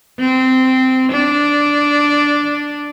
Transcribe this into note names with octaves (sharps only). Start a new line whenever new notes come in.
C4
D4